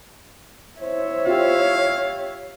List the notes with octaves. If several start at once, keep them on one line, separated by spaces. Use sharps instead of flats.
E4 C5 C#5 E5
F4 G4 F5